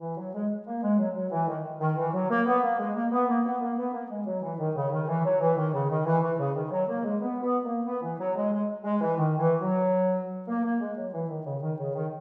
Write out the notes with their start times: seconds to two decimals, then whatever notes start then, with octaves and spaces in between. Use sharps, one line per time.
0.01 E3
0.17 F#3
0.34 G#3
0.67 A#3
0.82 G#3
0.99 F#3
1.16 F#3
1.31 E3
1.48 D#3
1.80 D#3
1.97 E3
2.13 F#3
2.29 A#3
2.46 B3
2.63 A#3
2.79 G#3
2.95 A#3
3.12 B3
3.28 A#3
3.45 B3
3.61 A#3
3.77 B3
3.93 A#3
4.10 G#3
4.26 F#3
4.42 E3
4.59 D#3
4.75 C#3
4.92 D#3
5.08 E3
5.24 F#3
5.40 E3
5.57 D#3
5.73 C#3
5.90 D#3
6.06 E3
6.22 E3
6.39 C#3
6.55 D#3
6.71 F#3
6.88 A#3
7.04 G#3
7.21 B3
7.42 B3
7.65 A#3
7.86 B3
8.02 E3
8.19 F#3
8.35 G#3
8.52 G#3
8.84 G#3
9.01 E3
9.17 D#3
9.39 E3
9.61 F#3
10.48 A#3
10.64 A#3
10.80 G#3
10.97 F#3
11.13 E3
11.29 D#3
11.46 C#3
11.62 D#3
11.79 C#3
11.95 D#3